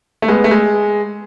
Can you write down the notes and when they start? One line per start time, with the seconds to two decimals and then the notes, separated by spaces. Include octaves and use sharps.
0.22 A3
0.28 G#3 B3
0.44 A3
0.51 G#3